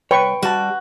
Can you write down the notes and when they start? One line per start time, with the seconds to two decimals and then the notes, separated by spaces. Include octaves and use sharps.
0.11 C2 B4 C#5 G5 C#6
0.43 G3 F#4 A5